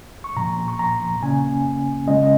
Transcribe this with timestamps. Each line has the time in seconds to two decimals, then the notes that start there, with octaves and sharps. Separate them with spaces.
0.24 C#6
0.37 A#2 F3 A#3 A#5
0.68 C#6
0.79 A#5
1.22 C#3 A#3 C#4 G#5
2.07 C#3 G#3 C#4 D#5
2.22 D#5